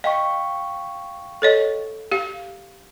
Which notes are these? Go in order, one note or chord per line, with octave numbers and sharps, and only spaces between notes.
D#5 F5 G5 C#6
A4 C#5 D#5
G4 F5